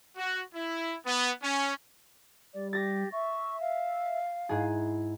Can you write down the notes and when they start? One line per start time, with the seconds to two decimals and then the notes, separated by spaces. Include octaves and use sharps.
0.17 F#4
0.55 E4
1.06 B3
1.43 C#4
2.54 G3 D5
2.73 G4 A6 A#6
3.12 E5 C#6
3.60 F5
4.49 G#2 E4 G#4